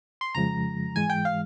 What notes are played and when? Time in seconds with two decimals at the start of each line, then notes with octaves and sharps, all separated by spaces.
0.21 C6
0.35 F2 C#3 F3 G#3 A#5
0.95 G#2 E3 G#3 G#5
1.10 G5
1.25 F5